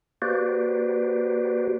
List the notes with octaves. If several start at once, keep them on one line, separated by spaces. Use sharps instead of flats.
A#3 F#4 G4 B4 C5 D5